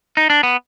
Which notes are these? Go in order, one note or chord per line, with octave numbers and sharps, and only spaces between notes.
D#4
D4
B3